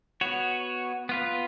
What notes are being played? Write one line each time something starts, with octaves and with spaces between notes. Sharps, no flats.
B3 F#4 C#5
B3 F4 B4